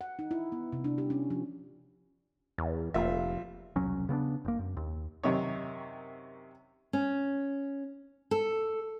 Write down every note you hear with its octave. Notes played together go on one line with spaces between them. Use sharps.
F#5
D#4
E4
B3
C3
D4
G4
C#4
F3
E2
F1 A#1 F4 E5
E1 C2 F#3 C#4
C#3 B3 C4 D4
F1 A#3
F#2
D#2
F#2 C3 D#3 C#5
C#4
A4